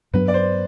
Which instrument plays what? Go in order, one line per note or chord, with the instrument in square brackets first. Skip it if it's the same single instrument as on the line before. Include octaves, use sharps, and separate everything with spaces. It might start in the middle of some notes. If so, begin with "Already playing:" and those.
[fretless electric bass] G2 F#3 B3 D4 [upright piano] B4
[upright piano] D5
C5